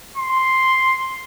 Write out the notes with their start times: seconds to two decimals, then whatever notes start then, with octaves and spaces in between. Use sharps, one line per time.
0.17 C6